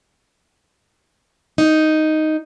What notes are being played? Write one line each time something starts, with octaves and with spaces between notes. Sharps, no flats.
D#4